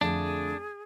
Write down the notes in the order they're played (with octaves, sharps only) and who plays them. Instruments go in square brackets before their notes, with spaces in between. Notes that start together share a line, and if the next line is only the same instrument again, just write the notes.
[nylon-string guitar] F2 D3 A3 [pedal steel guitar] D4 [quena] G#4